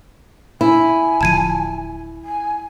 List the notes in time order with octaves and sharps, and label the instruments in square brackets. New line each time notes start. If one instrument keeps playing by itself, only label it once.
[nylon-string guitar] E4 [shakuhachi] G#5
[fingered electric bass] D1 D2 F3 [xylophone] A5 G#6 D#7
[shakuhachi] G#5